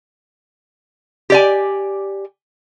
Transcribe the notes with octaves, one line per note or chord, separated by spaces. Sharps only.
G4 D5 G#5